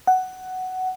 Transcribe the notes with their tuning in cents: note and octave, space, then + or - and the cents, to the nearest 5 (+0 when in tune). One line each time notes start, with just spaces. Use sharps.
F#5 +10